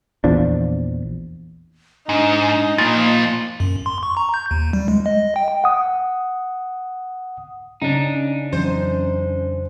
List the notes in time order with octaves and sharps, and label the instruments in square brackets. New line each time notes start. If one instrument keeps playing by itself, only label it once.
[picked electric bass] A#1 E2 F3 D4
[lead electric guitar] G#2 [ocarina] D4 [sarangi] D#4
[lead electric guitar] A#2 F3 [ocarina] A#3 [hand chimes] A6
[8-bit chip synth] F#2
C6
C#6
A#5
G6
D#2
G3
G#3
D#5
G5
[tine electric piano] F#5 D#6
[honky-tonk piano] C#3 [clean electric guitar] D4 D#4
[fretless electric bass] F2 E3 F#3 [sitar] C5